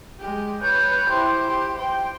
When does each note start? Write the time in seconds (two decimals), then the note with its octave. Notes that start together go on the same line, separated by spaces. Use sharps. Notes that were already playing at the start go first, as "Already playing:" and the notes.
0.20 G#3 G4
0.62 B4 C#5 G6
1.09 E4 G4 C5
1.48 G4
1.77 C5 G5